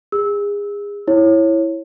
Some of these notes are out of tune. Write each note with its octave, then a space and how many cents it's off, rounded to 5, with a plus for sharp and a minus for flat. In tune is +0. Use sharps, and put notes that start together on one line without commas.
G#4 -30 E6 -20
E4 +0 C#5 -20